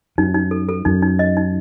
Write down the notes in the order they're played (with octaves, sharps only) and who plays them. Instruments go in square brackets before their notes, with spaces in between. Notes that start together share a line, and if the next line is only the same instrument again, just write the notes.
[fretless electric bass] F#2 [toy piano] D#4
[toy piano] D#4
A4
A4
[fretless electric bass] F#2 [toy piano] D#4
[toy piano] D#4
D#5
D#4